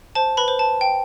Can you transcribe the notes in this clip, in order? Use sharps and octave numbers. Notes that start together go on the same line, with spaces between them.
C5 A5
B4 B5
C5
A5
G5